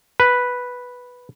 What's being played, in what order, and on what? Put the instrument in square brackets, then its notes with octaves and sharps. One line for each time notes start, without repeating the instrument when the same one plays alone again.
[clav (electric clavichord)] B4